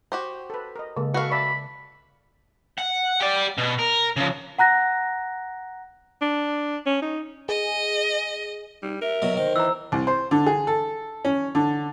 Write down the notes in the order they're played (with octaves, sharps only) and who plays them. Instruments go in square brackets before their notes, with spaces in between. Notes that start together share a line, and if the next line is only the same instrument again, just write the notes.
[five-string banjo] F#4 G4 C5
[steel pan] A4 B4
A#4 D#5
[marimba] C#3 [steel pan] G#3 A#3 A4
[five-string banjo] F#4 F5 [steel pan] A4 B4 [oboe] C#6
[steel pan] D5 E5 A5 [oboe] B5
[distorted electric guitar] F#5
G4 D5
B2
A#4
C#3 F3
[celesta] F#5 A#5 F#6 A#6
[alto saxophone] D4
C#4
D#4
[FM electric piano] G#4 [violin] D#5
[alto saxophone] G3 [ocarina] D#4
[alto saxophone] A#4 [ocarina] E5
[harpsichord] B2 F#3
[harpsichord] D#3 [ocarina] C5
[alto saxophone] E3 [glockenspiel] A#5 E6
[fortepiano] C2
C5
D3
G#4
A4
C#4
D3